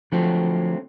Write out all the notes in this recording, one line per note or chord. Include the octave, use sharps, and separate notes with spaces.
D3 F3 F#3 A3 C4